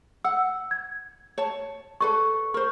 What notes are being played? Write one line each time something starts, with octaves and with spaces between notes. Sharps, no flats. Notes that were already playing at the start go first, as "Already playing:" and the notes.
F#5 E6
G#6
C#5 A5
A4 B4 D5 C#6
A#4 C5 C#6